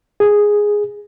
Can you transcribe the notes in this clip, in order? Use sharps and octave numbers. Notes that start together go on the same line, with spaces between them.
G#4